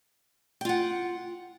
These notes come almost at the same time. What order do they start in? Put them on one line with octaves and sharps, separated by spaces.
G5 F4 F#5